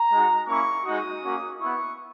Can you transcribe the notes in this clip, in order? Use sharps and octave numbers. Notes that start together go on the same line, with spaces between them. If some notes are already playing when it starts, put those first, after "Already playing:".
Already playing: A#5
G#3 D#4 F#4
A#3 C#4 E4 C#6
G#3 D#4 F#4 D#6
A#3 C#4 F#4
B3 E4 C#6